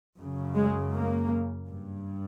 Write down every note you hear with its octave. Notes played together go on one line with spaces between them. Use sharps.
F#2 C#3
G#3
A#3
G2